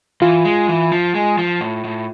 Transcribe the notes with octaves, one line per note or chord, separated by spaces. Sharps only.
E3 F4
G#3
E3
F3
G#3
F3
A2
A2